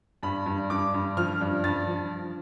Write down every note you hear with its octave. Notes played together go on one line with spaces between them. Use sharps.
G2 B5
G2
G2 D6
G2
F3 F6
G2
G2 A6
F3